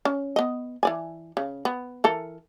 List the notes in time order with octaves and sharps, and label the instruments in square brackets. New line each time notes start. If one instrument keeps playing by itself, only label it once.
[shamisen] C#4
B3 D#5
E3 D5 G#5
C#3
B3
E3 A4 A#4